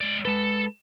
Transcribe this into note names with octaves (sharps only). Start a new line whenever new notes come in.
G#3 D5
G#3 A4 B4 A5